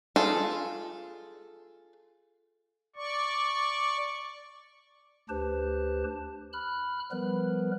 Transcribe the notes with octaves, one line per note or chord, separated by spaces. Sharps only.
F4 G#4 A4
D5 C#6
D2 D4 G4 B4 C5 A5
B5 F6 F#6
F3 G3 B3 A#4 B4